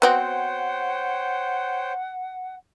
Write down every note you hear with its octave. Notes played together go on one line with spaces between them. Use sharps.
B3 C4 F#4 C5 C#5 F#5 G5